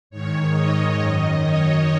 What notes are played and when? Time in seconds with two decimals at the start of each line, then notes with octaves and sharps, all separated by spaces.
0.10 G#2 D#3 C#5
0.53 D#5
0.98 F#2 D#3 D#5
1.42 C#5